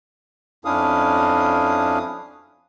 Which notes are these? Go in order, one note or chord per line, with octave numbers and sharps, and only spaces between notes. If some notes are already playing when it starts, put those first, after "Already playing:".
F2 C#4 D4 E4 F5 D#6